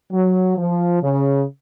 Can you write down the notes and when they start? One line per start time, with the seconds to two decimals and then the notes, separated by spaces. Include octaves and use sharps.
0.12 F#3
0.57 F3
1.03 C#3